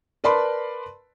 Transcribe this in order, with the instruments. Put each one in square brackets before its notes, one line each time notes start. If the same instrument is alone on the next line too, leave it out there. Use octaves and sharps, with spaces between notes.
[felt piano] A#4 B4 D5 A5 B5 C6